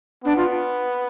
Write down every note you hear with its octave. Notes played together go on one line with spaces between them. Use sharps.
B3 D4
F4